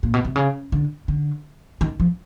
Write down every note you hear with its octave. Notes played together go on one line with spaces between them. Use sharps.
A#2
B2
C3
C#3
D3
D3
D#3
F3